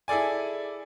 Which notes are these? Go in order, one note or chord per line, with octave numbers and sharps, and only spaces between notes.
E4 G#4 A4 D5 G#5